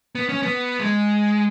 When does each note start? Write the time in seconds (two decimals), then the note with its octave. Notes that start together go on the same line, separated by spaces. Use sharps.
0.15 B3
0.29 C#4
0.43 B3
0.80 G#3